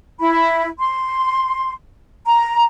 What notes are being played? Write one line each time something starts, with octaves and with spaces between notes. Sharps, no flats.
E4 B5
C6
A#5